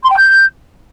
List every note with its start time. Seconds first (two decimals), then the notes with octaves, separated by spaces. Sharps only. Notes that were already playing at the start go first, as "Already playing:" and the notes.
0.03 C6
0.09 G5
0.16 G6